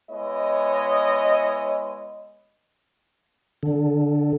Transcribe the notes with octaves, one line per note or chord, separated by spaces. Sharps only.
G#3 B3 E4 C#5 D#5
D3